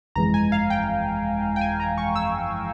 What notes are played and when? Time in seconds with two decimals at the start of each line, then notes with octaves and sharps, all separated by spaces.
0.15 G1 F2 E3 G#3 A#5
0.34 G#5
0.52 F5
0.70 G5
1.56 G5
1.61 G#5
1.80 A#5
1.98 C#6
2.15 E6